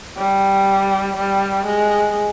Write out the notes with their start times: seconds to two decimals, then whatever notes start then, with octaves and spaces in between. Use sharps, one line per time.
0.18 G3
1.17 G3
1.66 G#3